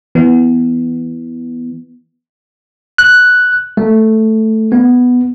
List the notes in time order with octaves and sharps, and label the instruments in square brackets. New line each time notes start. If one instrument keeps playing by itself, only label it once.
[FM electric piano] E3 B3
[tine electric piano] F#6
A3
B3